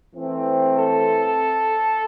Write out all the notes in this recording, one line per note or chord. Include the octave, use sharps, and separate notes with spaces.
E3 A3 C4
A4